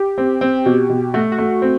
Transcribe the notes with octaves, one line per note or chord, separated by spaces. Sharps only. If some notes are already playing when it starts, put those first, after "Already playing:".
Already playing: G4
C4
C4
B2
B2
A3 F#4
F#4
A3
C4